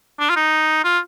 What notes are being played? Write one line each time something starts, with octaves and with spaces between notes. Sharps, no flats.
D4
F4
D#4
F4